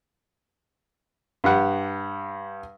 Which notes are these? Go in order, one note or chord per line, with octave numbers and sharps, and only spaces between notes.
G2 G4 F#5